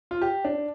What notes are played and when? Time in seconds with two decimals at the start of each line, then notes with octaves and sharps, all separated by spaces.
0.11 F4
0.22 G4
0.45 D4